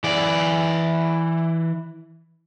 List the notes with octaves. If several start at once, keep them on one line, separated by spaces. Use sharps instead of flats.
E3 D5